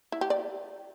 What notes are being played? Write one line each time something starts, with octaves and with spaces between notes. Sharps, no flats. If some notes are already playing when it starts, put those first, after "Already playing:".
E4
G4
D5